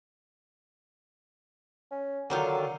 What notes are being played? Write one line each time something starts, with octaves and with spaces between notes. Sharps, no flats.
C#4
D3 D#3 F#3 F4